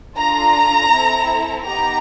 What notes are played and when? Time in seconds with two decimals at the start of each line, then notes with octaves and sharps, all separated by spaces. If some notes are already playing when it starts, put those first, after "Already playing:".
0.17 D4 F4 A4 A#5
0.92 C4 E4 A4
1.67 B3 D#4 G4 A#5